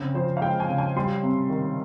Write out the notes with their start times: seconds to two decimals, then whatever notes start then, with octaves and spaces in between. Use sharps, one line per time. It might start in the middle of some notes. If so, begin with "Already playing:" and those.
Already playing: C#3 C4
0.14 F3 C5
0.37 F5
0.41 G#3 G5
0.60 G#5
0.69 C#3
0.78 G#5
0.96 G3 C6
1.23 C3
1.49 D#3